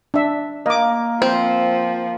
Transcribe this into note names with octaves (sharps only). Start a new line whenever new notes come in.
D4 E5
A#3 D#5 D6
F3 C4 C5